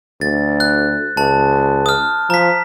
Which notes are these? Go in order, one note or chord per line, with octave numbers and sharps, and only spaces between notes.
D2 A6
F#6
C#2 A5
D#6 F6
F3 A#5 B6